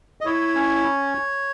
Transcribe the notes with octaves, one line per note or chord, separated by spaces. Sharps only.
D#5
E4 C#5
C#4